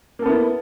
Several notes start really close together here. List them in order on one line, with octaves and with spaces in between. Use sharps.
A#3 A4 B3 E4